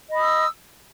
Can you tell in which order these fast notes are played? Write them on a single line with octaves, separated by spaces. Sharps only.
D#5 B5 D#6 E6